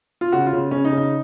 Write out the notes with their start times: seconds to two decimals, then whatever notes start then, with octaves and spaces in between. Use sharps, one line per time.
0.21 F4
0.32 C#3 F#4
0.46 F4
0.53 C#3
0.71 C#3 C#4
0.85 D#4
0.92 C#3
0.97 D#4